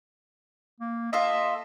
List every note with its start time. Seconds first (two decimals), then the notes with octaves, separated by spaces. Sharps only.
0.81 A#3
1.13 F4 A4 D#5 E5